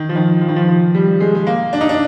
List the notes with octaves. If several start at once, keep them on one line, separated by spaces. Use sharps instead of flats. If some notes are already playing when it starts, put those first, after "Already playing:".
Already playing: D#3
F3
D#3
F3
D#3
F3
F3
G3
G#3
G#3
A#3
D4
D#4
D4